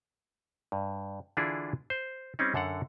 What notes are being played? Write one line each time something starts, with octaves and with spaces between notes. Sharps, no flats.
G2
D3 E3 D4 E4 F4 G#4
C5
G3 C4 C#4 D#4
F#2 D3 A4 F5 F#5